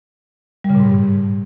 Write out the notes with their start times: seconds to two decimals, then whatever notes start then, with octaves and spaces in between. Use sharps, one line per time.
0.64 G3
0.70 C#3
0.75 A#2
0.80 G#2
0.85 G2